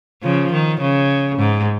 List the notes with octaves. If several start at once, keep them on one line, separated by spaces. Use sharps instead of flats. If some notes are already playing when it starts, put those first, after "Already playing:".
C#3 F3
D#3
C#3
G#2